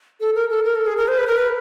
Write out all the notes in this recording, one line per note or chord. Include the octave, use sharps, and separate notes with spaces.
A4
A#4
A4
A#4
A4
G#4
A#4
C5
B4
A#4
B4